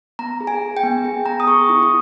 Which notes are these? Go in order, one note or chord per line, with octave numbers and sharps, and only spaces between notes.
B3 A#5
G#4
G#5
G#4
G5
B3
G#4
B3 A#5
D#6
G#4 C#6
E4 D#6
D#6